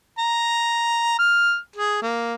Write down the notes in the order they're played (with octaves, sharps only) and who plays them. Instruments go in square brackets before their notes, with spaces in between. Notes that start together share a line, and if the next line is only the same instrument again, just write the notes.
[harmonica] A#5
F6
G#4
A#3